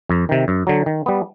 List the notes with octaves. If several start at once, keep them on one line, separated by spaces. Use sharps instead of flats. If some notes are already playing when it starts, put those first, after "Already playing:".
F2
C3 D#3
F#2
D3 F#3
D#3
G3 B3